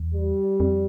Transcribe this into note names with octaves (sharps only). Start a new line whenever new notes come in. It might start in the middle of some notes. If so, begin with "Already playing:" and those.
Already playing: E2
G3
F2